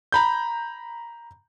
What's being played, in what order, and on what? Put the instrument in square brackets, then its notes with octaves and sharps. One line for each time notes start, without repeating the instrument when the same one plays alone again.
[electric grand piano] A#5 B5 G6